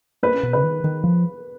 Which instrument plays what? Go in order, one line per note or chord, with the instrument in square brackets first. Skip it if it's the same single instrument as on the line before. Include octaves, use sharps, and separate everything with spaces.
[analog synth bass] A#2 [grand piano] B4
[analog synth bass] C#3
B2
[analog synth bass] C#3 [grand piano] B4
[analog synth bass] D#3
D#3
F3